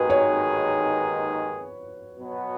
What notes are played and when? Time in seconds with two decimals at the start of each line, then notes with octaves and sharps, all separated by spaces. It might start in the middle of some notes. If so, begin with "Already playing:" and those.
Already playing: D#2 D#3 G#3 D#4 F#4 G#4 B4
0.10 C#5
2.19 B2 F#3 B3